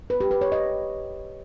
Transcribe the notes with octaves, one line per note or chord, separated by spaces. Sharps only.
B4
G4
B4
C#5
D#5